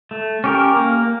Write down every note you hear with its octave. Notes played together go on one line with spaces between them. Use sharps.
A3
C#4 G4 A#4
A#3